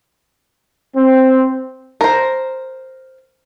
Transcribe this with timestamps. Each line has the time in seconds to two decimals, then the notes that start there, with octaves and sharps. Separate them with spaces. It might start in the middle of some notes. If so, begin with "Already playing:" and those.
0.95 C4
2.01 A#4 C5